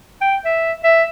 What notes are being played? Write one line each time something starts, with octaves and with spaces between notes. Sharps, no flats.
G5
E5
E5